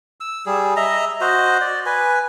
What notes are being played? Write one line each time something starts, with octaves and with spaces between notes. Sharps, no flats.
E6
G3 G#4
D#5 E5 A#5
F#4 C5 D#5
D5
B4 G#5